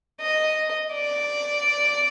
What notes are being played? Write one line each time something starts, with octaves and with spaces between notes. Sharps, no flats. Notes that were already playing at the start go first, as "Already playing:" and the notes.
D#5
D5